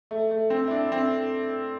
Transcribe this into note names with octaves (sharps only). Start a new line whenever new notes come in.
A3
A3
C4
E4
D4
C4